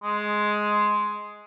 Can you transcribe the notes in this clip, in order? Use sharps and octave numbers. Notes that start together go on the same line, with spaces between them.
G#3